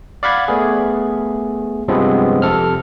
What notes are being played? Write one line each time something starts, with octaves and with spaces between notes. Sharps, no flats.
D5 F5 F#5 B5 G#6
A3 B3 G#4
G2 C3 F3 G#3 B3 C4
F2 C3 A4 F6